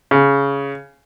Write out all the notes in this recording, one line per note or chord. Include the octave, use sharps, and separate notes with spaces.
C#3